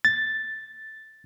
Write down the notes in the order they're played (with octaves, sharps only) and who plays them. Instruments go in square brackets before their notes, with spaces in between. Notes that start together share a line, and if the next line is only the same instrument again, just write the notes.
[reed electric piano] A6